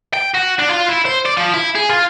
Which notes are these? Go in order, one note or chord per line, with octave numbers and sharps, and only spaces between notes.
G5
F#4
D4
F4
E4
C5
D5
F3
E4
G#4
F4